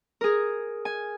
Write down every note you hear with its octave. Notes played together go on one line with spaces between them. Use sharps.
G#4 A#4
G#5